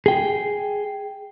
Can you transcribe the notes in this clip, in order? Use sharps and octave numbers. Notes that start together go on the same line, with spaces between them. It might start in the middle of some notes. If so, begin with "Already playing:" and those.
G#4 G5